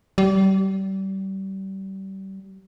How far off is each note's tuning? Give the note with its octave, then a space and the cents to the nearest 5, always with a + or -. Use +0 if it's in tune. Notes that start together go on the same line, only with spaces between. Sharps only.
G3 -30